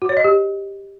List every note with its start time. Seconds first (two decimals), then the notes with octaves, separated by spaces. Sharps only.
0.02 F#4
0.09 C#5
0.17 D#5
0.24 G4